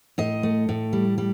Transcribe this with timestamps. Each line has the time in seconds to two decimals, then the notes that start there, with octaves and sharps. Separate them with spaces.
0.18 A2 D#5
0.43 A3
0.69 A2
0.93 G3
1.18 G3